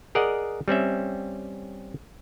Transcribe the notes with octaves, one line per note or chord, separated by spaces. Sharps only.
G#4 A#4 D5 D#5 F#5
G3 C4 C#4 E5